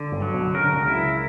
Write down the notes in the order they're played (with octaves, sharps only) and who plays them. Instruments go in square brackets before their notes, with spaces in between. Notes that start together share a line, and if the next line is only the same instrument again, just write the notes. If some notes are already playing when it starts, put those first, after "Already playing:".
Already playing: [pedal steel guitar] D3
[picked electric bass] G1 G2
[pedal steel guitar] F#3
[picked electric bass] B1 B2
[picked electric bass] C#3 [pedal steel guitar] A#4
[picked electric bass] D3
C#2 C#3
[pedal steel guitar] E4